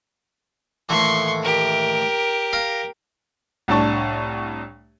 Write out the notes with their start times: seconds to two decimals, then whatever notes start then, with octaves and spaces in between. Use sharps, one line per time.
0.89 D#2 A2 E3 C6 C#6
1.42 G4 A#4
2.53 F5 A#5
3.68 C2 A2 D4 A5 C#6